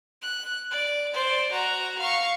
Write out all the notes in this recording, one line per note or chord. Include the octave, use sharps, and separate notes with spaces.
F#6
D5
C5 D5
F#4 A#5
F5 C#6